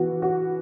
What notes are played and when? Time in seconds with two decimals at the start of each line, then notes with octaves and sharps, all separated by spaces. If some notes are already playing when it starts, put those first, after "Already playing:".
Already playing: E3 B3 F#4
0.22 F#4